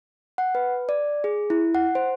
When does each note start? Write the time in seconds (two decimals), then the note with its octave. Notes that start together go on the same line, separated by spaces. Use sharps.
0.38 F#5
0.55 B4
0.89 D5
1.24 G#4
1.50 E4
1.75 F#5
1.95 C5